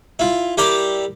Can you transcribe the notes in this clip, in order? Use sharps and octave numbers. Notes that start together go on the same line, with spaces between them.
E4 F4
G3 E4 G4 A#4 D5